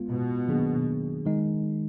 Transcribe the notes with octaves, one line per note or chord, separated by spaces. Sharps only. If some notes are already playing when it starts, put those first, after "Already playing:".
Already playing: G#3 B3 F4
B2
D#3 F#3 A#3 D4 G#4
D#3 G#3 D#4